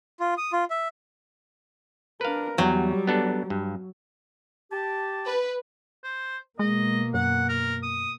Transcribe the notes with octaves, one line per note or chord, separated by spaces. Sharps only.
F4
D#6
F4
E5
D4 A#4 B4 F5
E2 F#3 G3 G5
B3 D4 A4
G2
G4 A5
B4
C5
B2 G#3 A#3 D#5
F#2 F#5
A#4
D#6